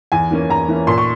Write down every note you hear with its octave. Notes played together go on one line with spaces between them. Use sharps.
E2 G#5
E3 A#3 C#4
E2 A#5
E3 A#3 C#4
A#2 C6
C#6